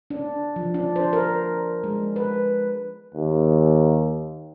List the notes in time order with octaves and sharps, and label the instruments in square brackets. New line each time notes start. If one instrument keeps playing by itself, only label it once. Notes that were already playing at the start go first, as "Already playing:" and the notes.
[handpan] D4
F3
D4
C5
A#4
G#3
B4
[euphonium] D#2